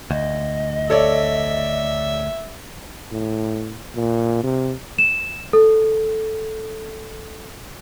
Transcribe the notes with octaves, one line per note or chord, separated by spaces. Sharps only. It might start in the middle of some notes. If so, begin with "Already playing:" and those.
D2 D#5
A4 C#5 D5 E5
A2
A#2
C3
E7
A4